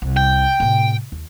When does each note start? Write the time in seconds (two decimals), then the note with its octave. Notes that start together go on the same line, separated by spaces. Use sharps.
0.02 C2
0.17 G5
0.60 A2 C3
1.12 D#2